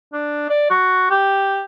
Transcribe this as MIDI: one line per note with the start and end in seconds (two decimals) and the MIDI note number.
0.13 0.47 62
0.50 0.67 74
0.70 1.08 66
1.11 1.63 67